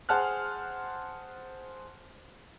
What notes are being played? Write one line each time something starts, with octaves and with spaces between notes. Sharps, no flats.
G#4 C5 F#5 A5 F6 F#6